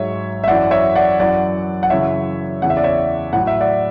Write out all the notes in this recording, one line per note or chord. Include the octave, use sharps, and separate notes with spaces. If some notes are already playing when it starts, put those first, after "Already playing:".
Already playing: G#2 F#3 C#5 E5
E5
F#2 E3 D5 F#5
C#5 E5
D5 F#5
F#2 E3 D5 F#5
F#5
F#2 C#3 E3 C#5 E5
E2 C#3 E3 F#5
E5
D5
C#5 E5
A2 F#3 F#5
E5
D5 F#5